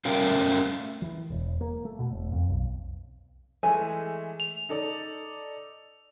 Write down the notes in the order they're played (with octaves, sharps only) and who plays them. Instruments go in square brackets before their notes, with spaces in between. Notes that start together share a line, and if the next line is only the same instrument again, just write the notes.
[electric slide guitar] A3 C#4 A#4 F5 G5
[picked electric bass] E3
E1
A#3
A3
B2
E1
F2
B1
[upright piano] E3 G#3 A3 [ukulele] G#5
[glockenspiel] F7
[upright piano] D#4 A4 D5